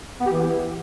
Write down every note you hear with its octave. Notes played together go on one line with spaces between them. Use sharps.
B3
G4
E3